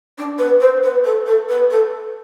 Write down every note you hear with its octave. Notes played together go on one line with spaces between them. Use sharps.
D4
B4
C5
B4
A4
A4
B4
A4